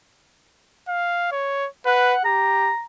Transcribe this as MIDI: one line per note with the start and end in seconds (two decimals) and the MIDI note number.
0.88 1.28 77
1.32 1.68 73
1.86 2.14 71
1.86 2.23 78
2.25 2.72 67
2.25 2.84 82